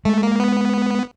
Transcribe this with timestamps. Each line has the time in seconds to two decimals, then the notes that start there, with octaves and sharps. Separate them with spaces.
0.05 G#3 A3
0.23 A#3
0.40 B3